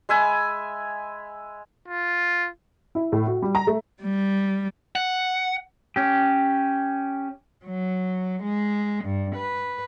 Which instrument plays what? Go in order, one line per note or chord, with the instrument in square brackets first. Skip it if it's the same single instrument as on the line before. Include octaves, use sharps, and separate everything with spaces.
[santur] G#3 E5 G#5 B5
[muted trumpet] F4
[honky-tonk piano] E4
A2
F#4
G3
A#5
A3
[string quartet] G3
[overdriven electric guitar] F#5
[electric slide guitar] C#4 G4
[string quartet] F#3
G#3
G2
B4